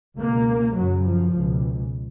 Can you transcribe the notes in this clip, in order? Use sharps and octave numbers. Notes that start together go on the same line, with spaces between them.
C#2 B2 A#3
F#2 C#3 F#3
F3
C#2 B2